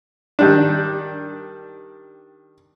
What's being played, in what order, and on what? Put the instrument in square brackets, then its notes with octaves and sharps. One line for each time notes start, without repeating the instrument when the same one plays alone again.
[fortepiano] D#3 G3 D4